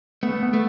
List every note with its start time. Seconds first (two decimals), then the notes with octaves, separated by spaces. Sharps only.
0.23 A3 B3
0.43 B3
0.54 A3